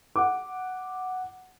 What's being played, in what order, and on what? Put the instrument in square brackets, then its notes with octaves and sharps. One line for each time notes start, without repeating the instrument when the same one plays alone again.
[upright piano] F#5 D6